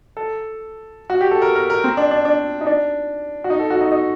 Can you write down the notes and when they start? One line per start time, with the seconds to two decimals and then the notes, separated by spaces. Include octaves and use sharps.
0.17 A4
1.10 F#4
1.21 G4
1.31 A4
1.42 A#4
1.56 A#4
1.70 A#4
1.84 C4
1.97 D4
2.11 D4
2.25 D4
2.61 D#4
2.67 D4
3.44 F#4
3.50 D#4
3.60 A4
3.70 F#4
3.81 D#4
3.92 D#4